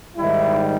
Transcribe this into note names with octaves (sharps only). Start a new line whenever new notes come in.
G#2 D#3 G3 E4